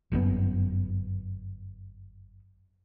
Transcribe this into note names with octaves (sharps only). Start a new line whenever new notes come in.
G1 F#2 C3 B3